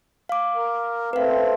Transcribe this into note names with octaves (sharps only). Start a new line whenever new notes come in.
F5 D6
A#4
A3 C4 B4 F5